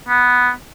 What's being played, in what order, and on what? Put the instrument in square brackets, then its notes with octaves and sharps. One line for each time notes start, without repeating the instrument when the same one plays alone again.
[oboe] B3